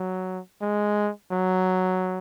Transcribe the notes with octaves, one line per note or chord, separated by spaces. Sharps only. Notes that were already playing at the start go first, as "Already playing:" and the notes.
Already playing: F#3
G#3
F#3